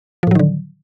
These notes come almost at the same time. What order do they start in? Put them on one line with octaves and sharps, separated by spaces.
F3 A2 F#3 D#3 D3